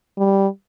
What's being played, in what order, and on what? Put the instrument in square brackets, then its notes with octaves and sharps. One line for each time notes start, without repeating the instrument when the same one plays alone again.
[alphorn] G3